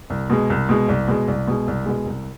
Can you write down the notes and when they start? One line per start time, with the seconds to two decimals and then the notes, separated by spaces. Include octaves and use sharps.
0.10 C2
0.29 B2 G#3
0.50 C2
0.69 B2 G#3
0.88 C2
1.07 B2 G#3
1.28 C2
1.47 B2 G#3
1.67 C2
1.86 B2 G#3
2.05 C2